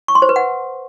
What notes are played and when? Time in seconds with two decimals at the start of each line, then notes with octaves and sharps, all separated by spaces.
0.08 C#6
0.15 C6
0.22 C5
0.29 B4
0.36 F#5